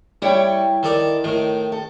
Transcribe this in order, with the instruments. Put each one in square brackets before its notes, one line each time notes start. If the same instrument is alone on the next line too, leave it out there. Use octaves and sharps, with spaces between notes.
[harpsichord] G3 [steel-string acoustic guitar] E4 C#5 G5
[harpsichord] D#3 A4 D5
A2 D#3
[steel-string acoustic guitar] A4